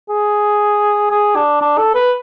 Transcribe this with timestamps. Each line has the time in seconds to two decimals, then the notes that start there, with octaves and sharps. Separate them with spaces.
0.10 G#4
1.11 G#4
1.36 D4
1.61 D4
1.78 A4
1.95 B4